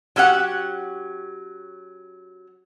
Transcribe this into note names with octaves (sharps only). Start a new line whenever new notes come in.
F#3 C#4 G4 F#5